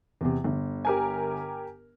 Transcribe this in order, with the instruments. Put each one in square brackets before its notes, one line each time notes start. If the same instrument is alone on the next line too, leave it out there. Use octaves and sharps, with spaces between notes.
[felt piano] E2 C3
G1
[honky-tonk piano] G4 A#4 G#5